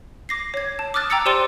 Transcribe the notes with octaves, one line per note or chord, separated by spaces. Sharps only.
D6 A#6 C7
C#5 G#6
A5
D6 D#6 F6 F#6 A6
G5 A#5 D6 E6 A6 C#7
G4 C5 D5 C6 D#7 G7